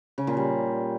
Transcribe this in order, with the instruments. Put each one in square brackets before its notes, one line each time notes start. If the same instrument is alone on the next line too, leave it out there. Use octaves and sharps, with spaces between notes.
[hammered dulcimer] C#3
A#2
G3